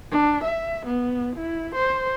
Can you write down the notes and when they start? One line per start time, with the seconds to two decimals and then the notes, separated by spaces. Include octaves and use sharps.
0.11 D4
0.44 E5
0.86 B3
1.36 E4
1.75 C5